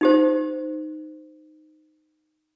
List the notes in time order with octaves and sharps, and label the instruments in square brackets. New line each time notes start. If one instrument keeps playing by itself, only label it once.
[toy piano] D#4 G4 C5